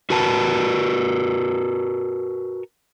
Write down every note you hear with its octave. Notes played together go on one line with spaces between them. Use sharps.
F#4 A#4 B4 A5